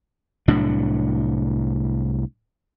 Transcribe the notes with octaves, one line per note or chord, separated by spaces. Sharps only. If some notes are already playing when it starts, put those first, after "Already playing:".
C2 A2 F#3 D4